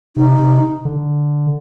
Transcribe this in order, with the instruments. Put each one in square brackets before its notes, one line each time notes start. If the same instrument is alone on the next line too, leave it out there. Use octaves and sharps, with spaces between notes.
[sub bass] C3 [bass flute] D#4
[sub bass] C3
D3